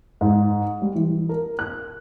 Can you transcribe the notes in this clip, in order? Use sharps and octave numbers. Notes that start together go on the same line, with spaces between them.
G#2
G3
E3
A#4
F#6